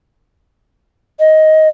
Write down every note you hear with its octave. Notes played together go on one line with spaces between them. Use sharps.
D#5